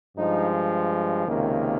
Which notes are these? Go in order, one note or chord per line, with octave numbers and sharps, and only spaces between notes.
G2 F3 G#3 D#4
C#2 C3 D#3 A#3